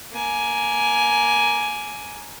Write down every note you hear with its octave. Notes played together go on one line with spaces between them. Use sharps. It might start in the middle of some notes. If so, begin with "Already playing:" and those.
A#3 G#5